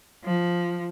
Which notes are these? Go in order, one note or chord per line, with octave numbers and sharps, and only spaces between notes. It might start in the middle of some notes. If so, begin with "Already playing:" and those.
F3